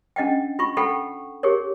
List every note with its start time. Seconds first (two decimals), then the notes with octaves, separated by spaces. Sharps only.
0.16 C#4 D4 D#5 F#5 G5
0.59 F4 B5 C#6
0.77 A4 F#5 G5 B5 C#6
1.43 G4 G#4 A#4 C#5